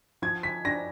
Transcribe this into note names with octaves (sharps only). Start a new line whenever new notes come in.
F3 G#6
B6
D4 A#6